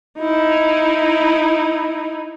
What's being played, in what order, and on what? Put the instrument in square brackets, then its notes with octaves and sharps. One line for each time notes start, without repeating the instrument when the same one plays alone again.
[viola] D#4 E4